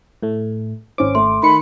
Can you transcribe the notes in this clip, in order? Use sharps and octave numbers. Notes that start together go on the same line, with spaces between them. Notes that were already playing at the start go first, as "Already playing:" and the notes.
A2 A3
G#1 C#4 C5 D6
A3 C6
D#3 B5 C#7